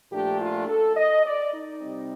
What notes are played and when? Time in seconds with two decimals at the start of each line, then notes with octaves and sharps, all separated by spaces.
0.12 A#2 F3 A3 D4 G4
0.40 F4
0.68 A4
0.97 D#5
1.25 D5
1.53 D#4
1.82 C3 G3 C4